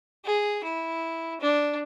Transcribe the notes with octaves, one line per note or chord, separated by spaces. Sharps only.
G#4
E4
D4